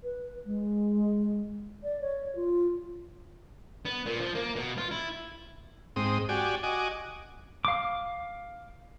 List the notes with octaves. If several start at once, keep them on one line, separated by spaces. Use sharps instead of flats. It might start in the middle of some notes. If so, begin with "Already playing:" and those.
B4
G#3
D5
C#5
F4
B3
A#2
F3
A#3
B2
F4
E4
G#2 C4 D#6
F#4 G4 D5 G#5
F#4 D#5 G#5 D6
F5 D6